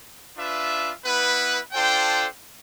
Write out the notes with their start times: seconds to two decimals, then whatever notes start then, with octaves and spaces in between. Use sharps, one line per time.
0.37 D4 F4 B4 E5
1.05 B3 E4 B4
1.73 D4 F4 A4 C5 G5